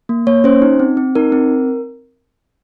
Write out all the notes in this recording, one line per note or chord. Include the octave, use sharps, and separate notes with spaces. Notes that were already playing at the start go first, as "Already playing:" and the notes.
A#3
A#3 C#5
C#4 C5
D#4
C4
C4
D#4 A#4
C4